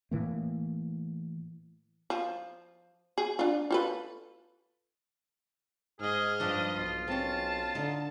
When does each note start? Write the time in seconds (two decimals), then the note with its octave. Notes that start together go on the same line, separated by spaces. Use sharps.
0.11 A2 E3 A#3
2.10 F3
3.18 G#4
3.39 D4 F4
3.71 F4 A4 B4
6.00 G#2 G#4 D#5 F6
6.40 G2 F3 D4
6.76 B1 F4
7.08 C4 C#4 A5
7.75 D3 D#4